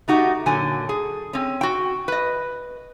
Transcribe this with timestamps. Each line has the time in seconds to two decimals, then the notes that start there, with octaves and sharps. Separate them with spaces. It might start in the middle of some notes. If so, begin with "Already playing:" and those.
0.08 A3 D#4 F#4 G4
0.46 A#2 D3 F#3 G#5
0.89 G#4
1.33 C4 C#4
1.61 F#4 G5
2.08 B4 D#5